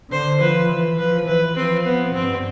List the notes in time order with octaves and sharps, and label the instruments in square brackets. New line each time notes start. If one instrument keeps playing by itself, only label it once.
[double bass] D3 [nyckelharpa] C5
[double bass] F3 [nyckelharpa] B4
[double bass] E3
[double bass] F3 [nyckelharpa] B4
[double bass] E3 [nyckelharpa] B4
[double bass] F3 [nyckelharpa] C4
[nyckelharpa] B3
[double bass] G2 [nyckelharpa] C4